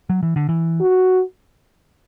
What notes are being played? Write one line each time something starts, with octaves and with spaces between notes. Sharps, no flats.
F#3
E3
D3
E3
F#4